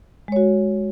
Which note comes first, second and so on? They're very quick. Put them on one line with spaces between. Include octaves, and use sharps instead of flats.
G#3 C#5 F#4